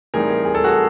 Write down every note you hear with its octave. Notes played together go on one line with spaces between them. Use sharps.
A2 E3 G3 C4 D#4 G#4 A#4
G#4
A4
F#4 G#4